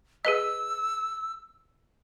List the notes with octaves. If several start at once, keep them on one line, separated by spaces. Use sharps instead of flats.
G#4 B4 D#5 E6